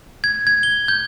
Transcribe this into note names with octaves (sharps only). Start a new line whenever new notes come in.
G#6
G#6
G7
G6